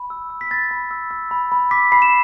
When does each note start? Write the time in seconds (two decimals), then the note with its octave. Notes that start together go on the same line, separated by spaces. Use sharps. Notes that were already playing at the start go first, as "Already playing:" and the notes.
Already playing: B5
0.10 E6
0.30 E6
0.41 B6
0.51 B5 A6
0.71 B5
0.91 E6
1.11 E6
1.31 B5
1.52 B5
1.71 D6 B6
1.92 B5 C7
2.02 E7